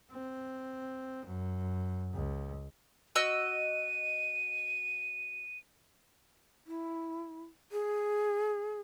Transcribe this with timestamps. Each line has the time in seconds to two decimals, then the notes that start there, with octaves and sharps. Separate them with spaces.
0.11 C4
1.26 F#2
2.13 C#2
3.15 F#4 D#5 E6 D#7
6.67 E4
7.72 G#4